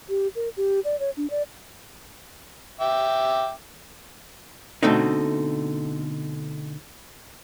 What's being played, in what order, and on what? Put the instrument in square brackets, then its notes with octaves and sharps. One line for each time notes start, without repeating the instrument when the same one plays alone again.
[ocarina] G4
A#4
G4
D5
C#5
D4
D5
[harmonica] E5 G5 D6
[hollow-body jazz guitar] B2 D3 A3 C4 D#4